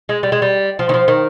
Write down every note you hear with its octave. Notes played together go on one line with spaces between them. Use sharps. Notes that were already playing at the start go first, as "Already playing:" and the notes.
G#3
G3
G#3
G3
F3
D#3
F3
D#3